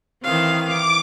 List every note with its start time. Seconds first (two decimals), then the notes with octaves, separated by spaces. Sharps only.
0.24 D#3 E3 C4 F5
0.65 D6